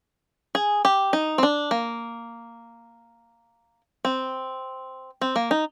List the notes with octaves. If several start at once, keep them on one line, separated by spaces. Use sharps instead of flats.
G#4
G4
D#4
C4
D4
A#3
C4
C4
A#3
D#4